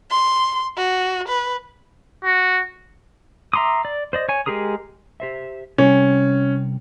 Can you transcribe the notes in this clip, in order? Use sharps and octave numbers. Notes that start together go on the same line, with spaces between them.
C6
F#4
B4
F#4
E5 A#5 C6 D6 D#6
D5
C5 D5 D#5
C#5 G#5
G#3 G4 G#4 A#4 D#6
G4 C5 E5
C3 G3 C#4